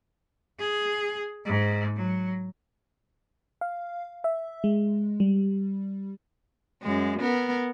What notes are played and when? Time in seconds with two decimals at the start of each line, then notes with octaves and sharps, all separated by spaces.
0.59 G#4
1.45 G#2
1.96 F#3
3.61 F5
4.24 E5
4.64 G#3
5.20 G3
6.83 F#2 G#3
7.21 B3 A#4